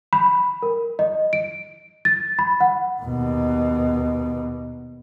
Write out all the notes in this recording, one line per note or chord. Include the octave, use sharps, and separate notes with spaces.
B5
A#4
D#5
D7
A6
B5
F#5
D#2 B2